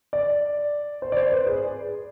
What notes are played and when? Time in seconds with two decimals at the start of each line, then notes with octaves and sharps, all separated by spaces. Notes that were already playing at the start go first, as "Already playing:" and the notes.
0.13 D5
1.02 C5
1.12 D5
1.17 C5
1.32 B4
1.47 G#4